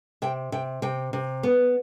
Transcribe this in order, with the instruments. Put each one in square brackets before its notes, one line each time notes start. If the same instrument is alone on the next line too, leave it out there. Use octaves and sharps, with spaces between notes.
[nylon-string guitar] C3 G5
C3 G5
C3 G5
C3
B3